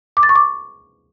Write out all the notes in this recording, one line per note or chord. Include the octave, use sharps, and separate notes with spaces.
D6
A6
C#6
D6